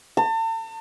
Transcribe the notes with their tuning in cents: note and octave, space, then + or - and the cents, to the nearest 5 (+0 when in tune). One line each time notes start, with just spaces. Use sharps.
A5 +40